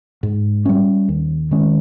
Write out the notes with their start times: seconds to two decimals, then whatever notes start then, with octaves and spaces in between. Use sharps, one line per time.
0.23 G#2
0.65 G3 C#4
1.08 D#2
1.51 D#3 G#3 C#4